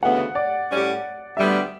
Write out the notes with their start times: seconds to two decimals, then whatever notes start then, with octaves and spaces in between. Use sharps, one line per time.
0.02 D2 C#3 E3 B3 F#5
0.35 D5
0.70 A2 G3 C#4 G4
1.36 D2 D3 G3 B3 E5